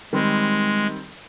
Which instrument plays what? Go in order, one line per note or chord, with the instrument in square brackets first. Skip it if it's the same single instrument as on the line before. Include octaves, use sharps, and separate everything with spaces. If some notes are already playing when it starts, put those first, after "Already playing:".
[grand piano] D#3 G3 C4 [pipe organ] G#3